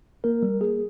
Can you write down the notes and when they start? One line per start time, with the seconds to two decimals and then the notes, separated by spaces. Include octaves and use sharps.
0.24 A#3 A#4
0.43 G3
0.61 A#3 G#4